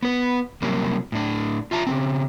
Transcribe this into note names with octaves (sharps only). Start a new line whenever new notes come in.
B3 B4
C3 F#3 G3 A#3 C#4
A2 D4
F4 E5 A5 A#5
C#3 G#3 C4